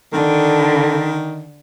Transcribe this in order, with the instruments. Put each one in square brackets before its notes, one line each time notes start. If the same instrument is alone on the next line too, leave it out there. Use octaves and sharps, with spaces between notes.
[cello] D3 [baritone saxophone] D#3 [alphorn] A4